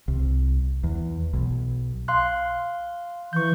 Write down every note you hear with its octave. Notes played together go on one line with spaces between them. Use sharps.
C2
E2
B1
F5 C6 F#6
E3 C#6 G6